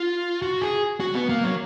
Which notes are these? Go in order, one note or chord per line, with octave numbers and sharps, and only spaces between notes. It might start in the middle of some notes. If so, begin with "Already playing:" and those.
Already playing: F4
F#4
G#4
F#4
B3
A#3
F#3